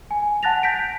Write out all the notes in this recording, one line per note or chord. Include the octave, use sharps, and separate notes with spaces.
G#5
F#5 A5 F#6 A6 A#6 F7
G6 A#6 B6 D7